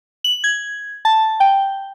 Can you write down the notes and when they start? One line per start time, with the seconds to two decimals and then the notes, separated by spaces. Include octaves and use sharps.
0.24 F#7
0.44 G#6
1.05 A5
1.40 G5